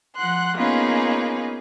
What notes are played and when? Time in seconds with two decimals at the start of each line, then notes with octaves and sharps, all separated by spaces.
0.15 F3 F#5 C6 F#6
0.57 A#3 B3 C#4 D#4 F4 G#4